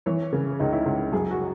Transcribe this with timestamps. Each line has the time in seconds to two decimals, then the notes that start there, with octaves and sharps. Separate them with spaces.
0.06 E3 C#5
0.33 C#3
0.60 C#2 D#4
0.72 E4
0.86 C#2
1.12 F#2 G#4
1.30 F#4